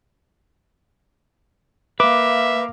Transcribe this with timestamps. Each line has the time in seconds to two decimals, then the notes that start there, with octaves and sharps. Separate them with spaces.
2.00 A#3 B4 E5 F5 D6